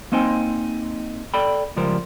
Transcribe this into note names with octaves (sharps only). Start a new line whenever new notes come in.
A#3 C4 D#4 C5 G5 G#5
A4 D5 G5 B5
C#2 F3 G3 A#4 C5